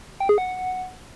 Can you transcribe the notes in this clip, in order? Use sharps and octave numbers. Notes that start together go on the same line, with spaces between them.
G5
G#4
F#5